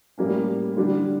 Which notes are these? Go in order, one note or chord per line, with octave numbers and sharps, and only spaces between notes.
A2 G3 A#3 C#4
D3 G3 D4